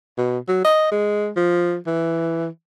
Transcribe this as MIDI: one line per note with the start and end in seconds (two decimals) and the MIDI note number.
0.18 0.38 47
0.48 0.60 54
0.65 0.90 75
0.91 1.30 56
1.36 1.77 53
1.87 2.47 52